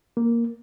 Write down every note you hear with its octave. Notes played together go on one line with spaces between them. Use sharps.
A#3